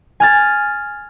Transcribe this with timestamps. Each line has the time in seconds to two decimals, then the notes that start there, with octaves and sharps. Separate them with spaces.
0.20 G#5 F6 A6